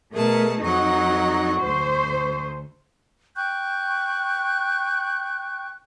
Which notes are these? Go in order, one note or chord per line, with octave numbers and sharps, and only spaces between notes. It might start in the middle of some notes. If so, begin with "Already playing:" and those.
B2 A3 G#4 A#4 A5
F2 F#3 D#4 F#5 C#6
D2 C5
G5 C#6 F#6 G6